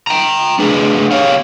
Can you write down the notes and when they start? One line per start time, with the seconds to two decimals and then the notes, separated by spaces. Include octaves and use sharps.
0.07 G5 A#5
0.59 A3 D4 G#4 B4
1.11 G4 C#5 F5